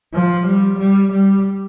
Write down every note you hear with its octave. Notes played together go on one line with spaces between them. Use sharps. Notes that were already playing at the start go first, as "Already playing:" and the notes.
F3
G3
G3
G3